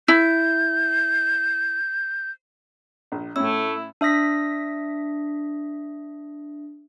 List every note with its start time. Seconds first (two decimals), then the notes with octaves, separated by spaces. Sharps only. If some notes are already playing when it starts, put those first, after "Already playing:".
0.08 E4 G6
3.12 A#1
3.36 A2 A3 C#4 E4 E6
4.01 D4 E5 D#6 A#6 B6